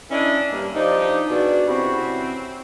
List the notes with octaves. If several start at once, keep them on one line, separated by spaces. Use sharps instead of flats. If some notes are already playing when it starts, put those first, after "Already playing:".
C#4 D4 E4 A#4 D5 D#5
G2 A#3
F3 D4 D#4 G4 C5 D5
B2 D4 G#4 C#5 D5
C3 C4 C#4 E4 F#4